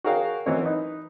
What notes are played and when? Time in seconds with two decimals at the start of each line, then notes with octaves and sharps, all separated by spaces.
0.04 F#4 G#4 A#4 C#5 F5 G5
0.46 E3 F#3 C4 A#4 C#5 D#5
0.62 D#4 B4